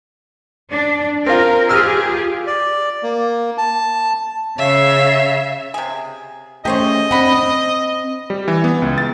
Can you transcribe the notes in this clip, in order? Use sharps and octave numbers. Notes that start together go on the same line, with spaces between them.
D4
C4 F4 A#4
F4 G4 G#4 E6 F6
D5
A#3
A5
C#3 C#5 E5 F5
C3 G#4
A3 C#4 G4 G#4 C5 C#5 D#5
C4 D4 F#5 B5
C4
G3
E3
B3
C#2
A6